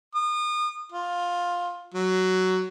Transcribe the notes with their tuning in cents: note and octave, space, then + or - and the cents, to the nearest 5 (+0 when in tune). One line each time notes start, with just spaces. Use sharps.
D#6 -35
F4 +10
F#3 +10